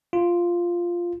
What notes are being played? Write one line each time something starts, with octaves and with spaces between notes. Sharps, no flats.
F4